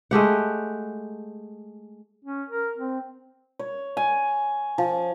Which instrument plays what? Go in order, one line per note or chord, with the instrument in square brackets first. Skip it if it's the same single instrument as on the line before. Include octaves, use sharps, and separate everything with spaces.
[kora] G#3 A3 G4 F#5
[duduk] C#4
A#4
C4
[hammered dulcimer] C#5
G#5
F3